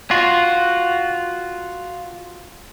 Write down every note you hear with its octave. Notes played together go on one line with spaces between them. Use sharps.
F4 F#4